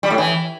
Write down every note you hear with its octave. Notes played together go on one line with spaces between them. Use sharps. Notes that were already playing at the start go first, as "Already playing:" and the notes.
G3
A2
E3